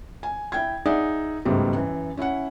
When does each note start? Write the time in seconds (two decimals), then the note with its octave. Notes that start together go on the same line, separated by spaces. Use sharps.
0.23 G#5
0.52 E4 G5 G#6
0.86 D#4 G#4 D5 E5 F#5
1.45 C#2 G#2 B2 G3 A3
1.74 F#2 E3
2.17 C#4 E4 E5 F#5